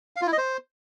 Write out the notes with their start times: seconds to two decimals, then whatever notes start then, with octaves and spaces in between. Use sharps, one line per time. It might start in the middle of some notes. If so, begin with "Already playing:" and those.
0.16 F5
0.22 F4
0.27 E4
0.32 D#5
0.38 C5